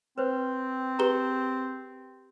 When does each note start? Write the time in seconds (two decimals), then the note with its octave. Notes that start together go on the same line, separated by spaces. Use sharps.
0.18 C4 B4 C5
0.99 G4 G#4 B4 A#5 G7